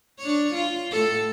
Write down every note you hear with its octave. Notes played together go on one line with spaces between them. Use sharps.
D4 C#5
F4
A2 A4